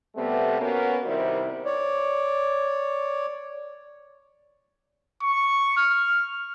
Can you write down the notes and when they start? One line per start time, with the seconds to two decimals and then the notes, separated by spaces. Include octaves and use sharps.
0.16 C3 G3 A3 B3
0.59 A#3 B3 C#4 F#4 A#4 B4
1.05 C3 D#3 G3 E4 C5
1.64 C#5 D5
5.23 C#6
5.77 F6